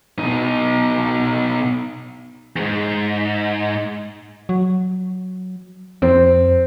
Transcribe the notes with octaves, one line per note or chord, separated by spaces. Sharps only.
B2 D#4
E2 G#2
F#3
F2 C4